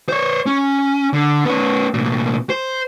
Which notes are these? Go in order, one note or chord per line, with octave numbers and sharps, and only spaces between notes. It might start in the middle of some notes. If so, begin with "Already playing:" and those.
C5 C#5
C#4
D3
B3 C#4
C2 A#2
C5